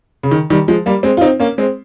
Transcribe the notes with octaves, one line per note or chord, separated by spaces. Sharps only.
C#3
D#3
D#3 G3
F3 G#3
G3 A#3
G#3 C4
F4
C4 D#4
A#3 C#4
G#3 C4